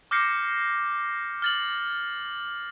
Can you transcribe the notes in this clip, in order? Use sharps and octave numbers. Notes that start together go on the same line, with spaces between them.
D6 F6 G6 A#6 C7 C#7
F6 A6 F#7